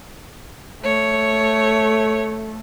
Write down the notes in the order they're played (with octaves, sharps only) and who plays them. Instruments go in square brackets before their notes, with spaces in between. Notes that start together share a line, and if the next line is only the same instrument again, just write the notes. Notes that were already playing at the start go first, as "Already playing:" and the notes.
[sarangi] A3 [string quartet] C#5